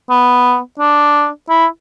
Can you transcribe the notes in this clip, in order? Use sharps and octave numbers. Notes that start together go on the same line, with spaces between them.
B3
D4
E4